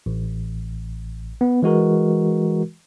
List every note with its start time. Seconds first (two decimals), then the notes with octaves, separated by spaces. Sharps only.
0.06 A1
1.41 B3
1.62 E3 G#3 F#4 A#4